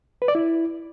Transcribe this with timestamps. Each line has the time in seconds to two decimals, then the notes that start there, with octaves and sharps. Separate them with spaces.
0.22 B4
0.28 D5
0.35 E4